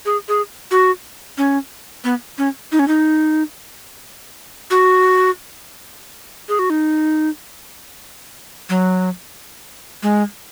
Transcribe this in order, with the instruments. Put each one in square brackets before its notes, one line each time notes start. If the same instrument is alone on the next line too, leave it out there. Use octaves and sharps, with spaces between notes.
[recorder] G#4
G#4
F#4
C#4
B3
C#4
D#4
C#4
D#4
F#4
G#4
F#4
D#4
F#3
G#3